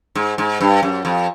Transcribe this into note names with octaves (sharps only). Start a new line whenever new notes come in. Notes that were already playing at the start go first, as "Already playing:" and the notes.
G#2
G#2
G2
F#2
F2